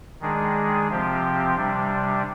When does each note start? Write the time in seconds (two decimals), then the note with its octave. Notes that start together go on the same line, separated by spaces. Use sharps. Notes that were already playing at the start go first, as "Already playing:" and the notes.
0.20 D#3 G#3 D4 G#4
0.88 C3 F3 C4 G4
1.55 C3 G3 D4